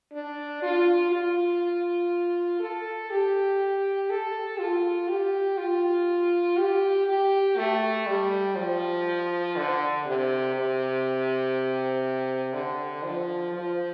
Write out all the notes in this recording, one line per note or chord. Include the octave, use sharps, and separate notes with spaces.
D4
F4
F4
A4
G4
A4
F4
G4
F4
G4
G4
A3
G3
F3
D3
C3
C3
D3
F3
F3